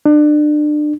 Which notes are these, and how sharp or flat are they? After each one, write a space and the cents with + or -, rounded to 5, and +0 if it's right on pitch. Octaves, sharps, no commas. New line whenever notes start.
D4 +30